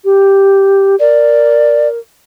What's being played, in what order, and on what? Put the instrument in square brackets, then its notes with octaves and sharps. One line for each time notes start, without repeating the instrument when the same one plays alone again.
[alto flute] G4
[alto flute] A#4 [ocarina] D5